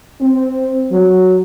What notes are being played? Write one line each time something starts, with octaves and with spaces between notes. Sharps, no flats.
C4
F#3